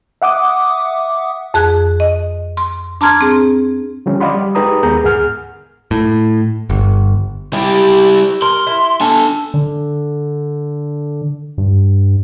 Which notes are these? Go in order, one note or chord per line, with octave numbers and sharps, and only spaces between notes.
E5 F#5 D6 D#6
F2 G#4 F#6
D#5
C6
D4 A5 A#5 C6 F6 G#6
C4 G#4
D3 F3 G3 C#4
D5 D#5 F5 F#5 B5 C6
G3
G#3 D#4 G4 B4 A#5 D#6
D#2 B3 G#4 A#4 A#5 G6
D2 G#2 G#4 F#5 F6
A2
G1
G3 E4 G4
A#4 C6
E4
D4 A4 G#5
D3
G2